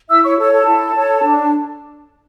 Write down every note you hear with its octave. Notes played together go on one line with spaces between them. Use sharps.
E4 E5 E6
C#5 C#6
A4 C#5
A4 A5
E4
A4 C#5
D4